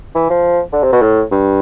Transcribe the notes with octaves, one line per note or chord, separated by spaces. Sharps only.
E3
F3
D3
C3
B2
A2
G2